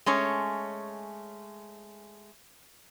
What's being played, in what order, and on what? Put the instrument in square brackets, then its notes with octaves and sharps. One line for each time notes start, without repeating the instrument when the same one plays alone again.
[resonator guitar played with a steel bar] G#3 A3 C#4 C#5